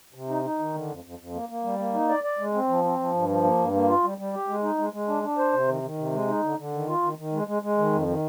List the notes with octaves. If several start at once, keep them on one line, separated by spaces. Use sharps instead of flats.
C3
D#4
D#4
D#3
D3
F2
F2
F2
A#3
A#3
G3
A#3
D#4
D5
D5
G#3
C4
F3
C4
F3
G2
F3
A#3
G2
A#3
F4
G3
G3
G4
G#3
D#4
G#3
G#3
D4
D4
C5
C3
D#3
D#3
C3
G#3
D#4
D3
D3
D#3
F4
D#3
D#3
G#3
G#3
G#3
D#3
F2
D#3